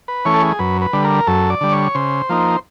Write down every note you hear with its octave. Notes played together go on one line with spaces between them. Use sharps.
B4
E3 A3 C#4 C#5
A4
G#4
F#2 B4
B4
D3 G3
A#4
F#2 A4
D5
D3 G3
C#5
C#3 C5
F3 A#3 D#4